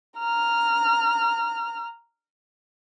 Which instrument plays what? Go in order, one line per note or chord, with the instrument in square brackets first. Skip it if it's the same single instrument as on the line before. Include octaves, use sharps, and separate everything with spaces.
[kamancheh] A#5 F6